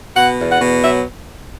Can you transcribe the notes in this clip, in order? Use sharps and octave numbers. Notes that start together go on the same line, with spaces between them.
B2 F#5
E2
F#5
B2
F#3 E5